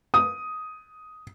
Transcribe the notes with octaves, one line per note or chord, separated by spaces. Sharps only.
D#6